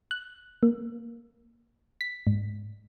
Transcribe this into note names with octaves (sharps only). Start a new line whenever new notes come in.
F#6
A#3
B6
G#2